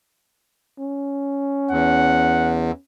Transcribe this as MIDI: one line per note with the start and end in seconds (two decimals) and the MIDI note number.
0.79 2.79 61
1.71 2.71 40
1.71 2.54 78